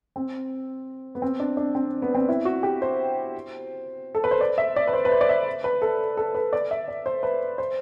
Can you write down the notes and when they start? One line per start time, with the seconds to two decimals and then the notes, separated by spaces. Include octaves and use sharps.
0.16 C4
1.15 B3
1.22 C4
1.40 D4
1.57 D4
1.75 C4
2.02 B3
2.14 C4
2.29 E4
2.45 F#4
2.63 G4
2.82 C5
4.15 A4
4.24 B4
4.31 C5
4.41 D5
4.58 E5
4.76 D5
4.87 B4
4.93 C5
5.05 B4
5.12 C5
5.21 D5
5.29 E5
5.64 B4
5.82 A4
6.17 A4
6.35 B4
6.53 D5
6.71 E5
6.88 D5
7.06 C5
7.23 B4
7.58 C5